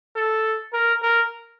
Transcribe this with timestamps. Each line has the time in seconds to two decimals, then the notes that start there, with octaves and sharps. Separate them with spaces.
0.16 A4
0.73 A#4
1.02 A#4